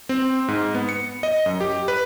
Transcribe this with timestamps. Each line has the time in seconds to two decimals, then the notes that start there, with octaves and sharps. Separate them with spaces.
0.09 C4
0.48 G#2
0.75 B3
0.89 C#7
1.23 D#5
1.46 F#2
1.61 G4
1.88 B4